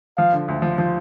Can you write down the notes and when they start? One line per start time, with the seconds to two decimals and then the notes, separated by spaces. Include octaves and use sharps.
0.17 F3 F5
0.33 D3
0.48 D2
0.62 F3
0.78 F3